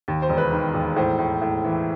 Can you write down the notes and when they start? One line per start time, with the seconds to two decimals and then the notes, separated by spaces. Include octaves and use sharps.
0.08 D#2
0.22 C5
0.29 E1
0.38 B4
0.52 D#3
0.74 E1
0.96 A2 C5
1.19 A2
1.42 A2
1.65 E3